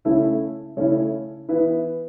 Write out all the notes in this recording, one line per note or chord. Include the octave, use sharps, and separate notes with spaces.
C#3 A3 C#4 E4 E5
C#3 A3 C#4 E4 C#5
E3 B3 E4 B4